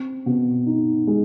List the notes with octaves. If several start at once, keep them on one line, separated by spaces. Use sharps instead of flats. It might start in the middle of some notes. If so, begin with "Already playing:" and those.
Already playing: C4
B2
D#4
G#3